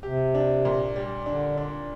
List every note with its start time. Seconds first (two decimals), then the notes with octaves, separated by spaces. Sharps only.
0.03 C3 G4
0.35 D4
0.65 A#2
0.96 G3
1.26 D3 D4
1.58 D4